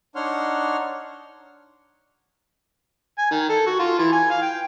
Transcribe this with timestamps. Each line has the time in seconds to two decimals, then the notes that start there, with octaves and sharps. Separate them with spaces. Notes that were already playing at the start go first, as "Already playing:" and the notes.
0.15 D4 D#4 C#5 F#5 C6 F6
3.18 G#5
3.31 D#3
3.49 A4
3.66 F#4
3.79 F4
3.98 E3
4.12 G#5
4.30 F5
4.42 G5